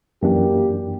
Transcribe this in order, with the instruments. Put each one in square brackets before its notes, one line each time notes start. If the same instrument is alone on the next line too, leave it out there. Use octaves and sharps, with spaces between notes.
[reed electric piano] F#2 E3 D4 [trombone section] A#3 G4